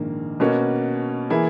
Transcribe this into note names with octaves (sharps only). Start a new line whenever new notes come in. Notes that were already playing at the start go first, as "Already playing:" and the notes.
Already playing: A#1 G#2 D#3 A#3
B2 A#3 C#4 F#4
E3 A#3 E4 G#4